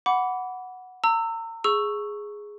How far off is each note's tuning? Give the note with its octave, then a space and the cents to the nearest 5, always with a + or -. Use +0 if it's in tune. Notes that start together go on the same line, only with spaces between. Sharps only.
F#5 +0 B5 +0 D6 -25
A#5 -35 E6 +0
G#4 +0 C#6 +0 E6 +5